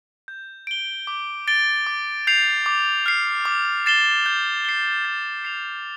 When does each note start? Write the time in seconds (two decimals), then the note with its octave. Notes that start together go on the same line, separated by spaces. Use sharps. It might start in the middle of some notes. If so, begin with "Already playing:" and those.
0.28 G6
0.67 D7 G7
1.07 D6
1.48 A6 D7 G7
1.86 D6
2.27 G6 C7 F7
2.66 D6
3.06 F6 C7
3.45 D6
3.86 A6 C7 E7 G7
4.26 G6
4.65 C7 G7
5.05 A6
5.45 C7 F7